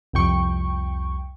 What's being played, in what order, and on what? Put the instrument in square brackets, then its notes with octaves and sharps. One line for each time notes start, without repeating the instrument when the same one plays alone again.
[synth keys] C2 F2 G5 C#6